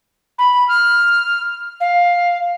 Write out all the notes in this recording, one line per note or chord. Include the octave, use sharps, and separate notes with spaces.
B5
F6
F5